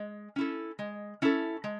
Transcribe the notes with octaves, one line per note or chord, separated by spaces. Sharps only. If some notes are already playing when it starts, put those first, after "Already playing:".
Already playing: G#3
C#4 E4 A4
G#3
C#4 E4 A4
G#3